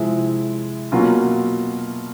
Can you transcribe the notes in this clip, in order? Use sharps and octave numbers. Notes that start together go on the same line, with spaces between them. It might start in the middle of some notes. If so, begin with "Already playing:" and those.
Already playing: C3 F3 G#3 C4 E4
B2 F#3 A#3 C#4 F4